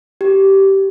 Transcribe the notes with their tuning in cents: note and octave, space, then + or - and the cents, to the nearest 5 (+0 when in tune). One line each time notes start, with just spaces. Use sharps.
G4 -15